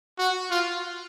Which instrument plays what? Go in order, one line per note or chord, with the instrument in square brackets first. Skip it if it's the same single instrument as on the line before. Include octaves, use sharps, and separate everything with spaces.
[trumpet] F#4
F4